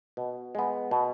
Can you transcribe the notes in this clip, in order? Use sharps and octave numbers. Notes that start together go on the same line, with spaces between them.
B2
G#3 B3
B2